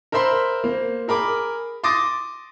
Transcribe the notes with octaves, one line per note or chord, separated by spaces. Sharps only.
A#4 C5 E5 B5 C6
A#3 C5
G#4 A#4 B5 D6
C6 D6 D#6 A6 A#6